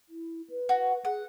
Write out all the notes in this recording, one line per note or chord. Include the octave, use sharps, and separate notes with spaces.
E4
B4
F#4
G#4 F#5